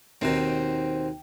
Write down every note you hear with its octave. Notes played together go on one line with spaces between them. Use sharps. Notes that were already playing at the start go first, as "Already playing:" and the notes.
D#2 B2 D#3 C4